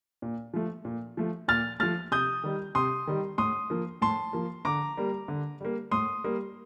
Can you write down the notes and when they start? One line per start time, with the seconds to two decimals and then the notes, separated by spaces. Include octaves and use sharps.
0.22 A#2
0.54 F3 A3
0.85 A#2
1.17 F3 A3
1.48 A#2 F6 A6
1.80 F3 A3 F6 A6
2.11 C3 D#6 G6
2.44 D#3 G3
2.75 C3 C6 D#6
3.07 D#3 G3
3.38 A2 C6 D#6
3.70 F3 A#3
4.02 A2 A5 C6
4.33 F3 A#3
4.65 D3 A#5 D6
4.97 G3 A#3
5.28 D3
5.61 G3 A#3
5.91 A2 C6 D#6
6.24 G3 A#3